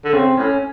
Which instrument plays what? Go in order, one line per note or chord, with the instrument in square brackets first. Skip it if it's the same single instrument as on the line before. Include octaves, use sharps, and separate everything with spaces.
[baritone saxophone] D3
[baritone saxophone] C#3 [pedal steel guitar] C4
[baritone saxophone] A2 [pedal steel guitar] C#4